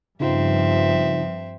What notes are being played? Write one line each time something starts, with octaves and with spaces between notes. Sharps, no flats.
G2 C#3 F3 C4 D#4 F4 E5